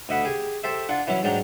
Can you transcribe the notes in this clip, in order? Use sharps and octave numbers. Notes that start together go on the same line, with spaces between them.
D2 D#5 E5 F#5 B5
G4 G#4 G#5
G4 A4 C5 E5
D4 F4 F#5
E3 F#3 C#4 E4
G#2 F#3 D4 G5 A#5